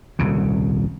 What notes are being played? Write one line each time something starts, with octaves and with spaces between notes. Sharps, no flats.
D#1 C2 C#3